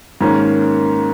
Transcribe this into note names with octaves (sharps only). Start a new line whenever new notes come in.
G#2 D#3 A#3 C#4